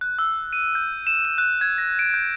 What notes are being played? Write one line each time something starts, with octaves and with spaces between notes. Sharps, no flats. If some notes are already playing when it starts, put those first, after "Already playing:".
F#6
E6
D#7
G6
E7
E7
F#6
G#6
A#6
D7
G6